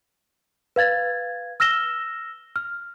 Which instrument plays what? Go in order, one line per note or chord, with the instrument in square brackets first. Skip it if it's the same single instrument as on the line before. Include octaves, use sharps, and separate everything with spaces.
[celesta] B4 F5 G#6 A6
E6 F6 A#6 E7 G7
F6